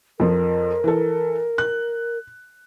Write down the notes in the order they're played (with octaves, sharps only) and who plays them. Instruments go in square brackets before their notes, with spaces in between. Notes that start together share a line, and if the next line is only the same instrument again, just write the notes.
[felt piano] F2 F3 [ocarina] A#4
[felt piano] E3 A4
F#6